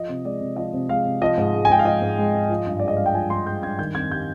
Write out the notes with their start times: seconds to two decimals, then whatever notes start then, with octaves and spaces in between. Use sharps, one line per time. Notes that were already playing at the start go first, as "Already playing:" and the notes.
Already playing: F3 D#5
0.09 C3
0.25 G#3 D5
0.41 C3
0.56 F3 D#5
0.74 C3
0.89 G#3 F5
1.05 C3
1.22 F3 D#5
1.38 G#2
1.54 G#3
1.65 G#5
1.70 G#2 G5
1.79 F5
1.85 F3 D#5
2.02 G#2
2.18 G#3
2.33 G#2
2.49 F3
2.67 G2
2.79 G#3 D5
2.88 D#5
2.97 G2 F5
3.06 G5
3.14 F3 G#5
3.30 G2 C6
3.46 G#3 G6
3.63 G2 G#6
3.79 D#3 G6
3.95 F2 G#6
4.10 G3 G6